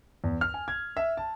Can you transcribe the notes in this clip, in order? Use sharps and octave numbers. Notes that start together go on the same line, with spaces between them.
E2
F6
G#5
G#6
E5
A5